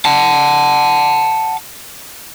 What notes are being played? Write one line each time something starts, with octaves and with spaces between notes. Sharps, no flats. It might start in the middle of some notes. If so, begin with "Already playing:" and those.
F#5 A5